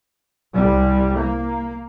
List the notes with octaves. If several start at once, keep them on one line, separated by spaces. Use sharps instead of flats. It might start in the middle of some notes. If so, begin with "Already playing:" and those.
C2 G3
A#3